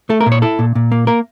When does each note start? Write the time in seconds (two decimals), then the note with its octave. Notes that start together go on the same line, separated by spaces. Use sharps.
0.09 A3 A4
0.21 A#4
0.26 A#2
0.32 C#5
0.42 E4 A4
0.59 A#2
0.75 A#2
0.92 A#3
1.07 A#3 A#4